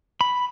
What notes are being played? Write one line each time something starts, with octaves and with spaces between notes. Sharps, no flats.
B5